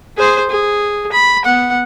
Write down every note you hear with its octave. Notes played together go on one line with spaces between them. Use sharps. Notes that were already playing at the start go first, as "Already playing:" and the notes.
G#4 C5
G#4
B5
B3 F#5